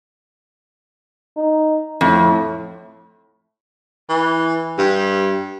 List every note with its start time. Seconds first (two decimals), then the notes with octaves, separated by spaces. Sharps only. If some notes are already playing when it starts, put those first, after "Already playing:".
1.37 D#4
2.01 F2 A2
4.09 E3
4.79 G2